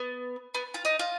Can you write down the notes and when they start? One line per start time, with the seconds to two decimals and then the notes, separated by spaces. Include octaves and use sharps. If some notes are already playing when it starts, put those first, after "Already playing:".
Already playing: B3
0.54 B3
0.74 F4
0.85 D#4
0.99 F4